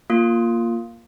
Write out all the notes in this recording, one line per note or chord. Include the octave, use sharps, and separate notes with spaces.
A#3 F4